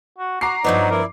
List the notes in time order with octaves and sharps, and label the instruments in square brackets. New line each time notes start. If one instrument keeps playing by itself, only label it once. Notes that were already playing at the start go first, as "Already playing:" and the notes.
[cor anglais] F#4
[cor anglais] F#4 [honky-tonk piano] A#5 D6 C7
[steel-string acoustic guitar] G2 F3 B3 [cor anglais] F#3 [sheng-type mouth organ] D#4 D5
[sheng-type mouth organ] E4 D5 [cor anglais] A#4